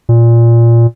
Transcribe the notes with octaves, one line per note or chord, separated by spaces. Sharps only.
A#2